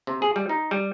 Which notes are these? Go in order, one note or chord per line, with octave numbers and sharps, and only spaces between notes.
C3
G#4
G3
D#4
G3